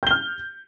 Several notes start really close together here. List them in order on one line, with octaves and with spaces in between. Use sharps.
G6 G7 F6